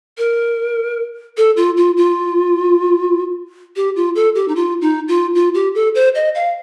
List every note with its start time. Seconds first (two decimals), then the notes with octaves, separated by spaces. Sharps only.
0.18 A#4
1.37 A4
1.57 F4
1.77 F4
1.97 F4
3.76 G4
3.96 F4
4.16 A4
4.35 G4
4.48 D#4
4.56 F4
4.81 D#4
5.08 F4
5.35 F4
5.54 G4
5.75 A4
5.95 C5
6.15 D#5
6.35 F5